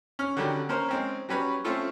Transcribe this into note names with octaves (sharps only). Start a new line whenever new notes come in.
C#4 F6
D3 D#3 F#3 G3 C#4
A#3 C#4 A#4 C5
G#3 C4 C#4
F#3 G3 C#4 B4 C#5
A3 C4 C#4 F4 A4